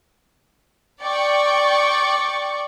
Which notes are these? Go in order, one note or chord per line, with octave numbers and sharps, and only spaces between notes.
D5 G5 C#6